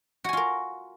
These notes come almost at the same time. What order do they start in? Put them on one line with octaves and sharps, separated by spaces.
F#4 G#5 F4 A#4